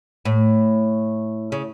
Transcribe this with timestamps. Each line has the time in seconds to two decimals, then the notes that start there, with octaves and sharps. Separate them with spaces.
0.25 A2
1.52 C#3